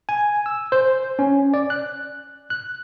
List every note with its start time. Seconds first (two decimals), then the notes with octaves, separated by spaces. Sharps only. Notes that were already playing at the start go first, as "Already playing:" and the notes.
0.09 G#5
0.46 E6
0.72 C5
1.19 C#4
1.54 D5
1.70 F#6
2.50 F#6